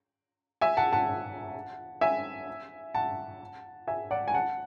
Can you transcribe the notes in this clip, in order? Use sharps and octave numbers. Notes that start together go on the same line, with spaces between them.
E5 G#5
F#5 A5
F#5 A5
E5 G#5
F#5 A5
E5 G#5
D5 F#5
G#5
F#5 A5